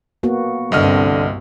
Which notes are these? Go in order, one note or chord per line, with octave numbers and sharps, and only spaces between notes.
A#3 B3 F#4
C2 G2 D3 C4 D#5 F6